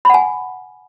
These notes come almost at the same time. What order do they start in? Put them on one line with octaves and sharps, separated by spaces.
B5 F#5 G#5